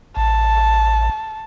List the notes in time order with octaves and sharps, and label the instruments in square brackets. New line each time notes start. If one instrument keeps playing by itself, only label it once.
[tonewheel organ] A1 [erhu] A5